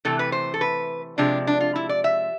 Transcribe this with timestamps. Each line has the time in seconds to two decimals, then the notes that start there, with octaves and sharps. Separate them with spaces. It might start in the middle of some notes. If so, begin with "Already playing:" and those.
0.05 C3 E3 A3 A4
0.19 B4
0.32 C5
0.54 A4
0.61 B4
1.18 C3 F3 G#3 D4
1.47 D4
1.60 F4
1.76 E4
1.89 D5
2.04 E5